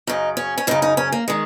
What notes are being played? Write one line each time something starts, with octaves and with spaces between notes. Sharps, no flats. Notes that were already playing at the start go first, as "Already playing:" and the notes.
F#2 C#3 D#4
C#4
C#4
F#2 C#3 D#4
D#4
C#4
A#3
D#3 G#3